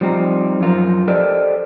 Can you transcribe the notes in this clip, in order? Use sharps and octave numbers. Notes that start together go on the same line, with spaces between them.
F3 G3 C4 D#4
F#2 F3 F4 A#4
G4 A4 A#4 C5 D5 D#5